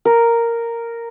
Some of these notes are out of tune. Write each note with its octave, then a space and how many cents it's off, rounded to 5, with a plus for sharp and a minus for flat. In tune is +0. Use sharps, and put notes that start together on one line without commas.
A#4 -5